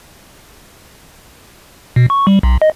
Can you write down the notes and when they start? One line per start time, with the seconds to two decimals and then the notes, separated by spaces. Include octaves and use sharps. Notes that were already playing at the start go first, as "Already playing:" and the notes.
1.96 B2
2.10 C#6
2.27 G3
2.43 B1
2.62 D#5